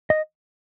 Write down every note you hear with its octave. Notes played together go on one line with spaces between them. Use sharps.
D#5